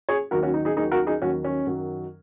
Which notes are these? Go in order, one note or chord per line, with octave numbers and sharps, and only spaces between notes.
G#4 C#5
D#2 D#3 F#3 F#4 A#4
C#4 F#4
D#4
D#4 G#4
D#2 D#3 F#3 D#4 G#4
F#4 A#4
D#4 G#4
D#2 D#3 F#3 C#4 F#4
C#4
F#2 D#3 F#3